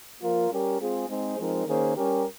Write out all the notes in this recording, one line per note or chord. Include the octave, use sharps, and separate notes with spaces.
F3 A#3 F4 A#4
G3 C#4 G4 A#4
G#3 C4 F4 G#4
G#3 C4 D#4 G#4 C5
F3 G#3 C4 D#4 A#4
D#3 A#3 C#4 G#4 C5
G3 C#4 G4 A#4